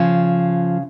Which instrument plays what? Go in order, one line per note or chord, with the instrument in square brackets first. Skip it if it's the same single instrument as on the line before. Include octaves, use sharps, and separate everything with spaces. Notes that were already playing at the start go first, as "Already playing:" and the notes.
Already playing: [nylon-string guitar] C#3 F3